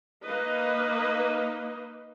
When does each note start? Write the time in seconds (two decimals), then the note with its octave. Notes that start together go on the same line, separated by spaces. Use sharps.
0.24 A#3 D#4 B4 D#5